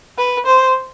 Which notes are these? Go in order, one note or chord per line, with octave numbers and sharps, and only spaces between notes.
B4
C5